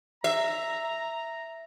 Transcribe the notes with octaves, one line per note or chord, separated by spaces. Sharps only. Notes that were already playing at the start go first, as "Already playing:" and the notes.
E5 A#5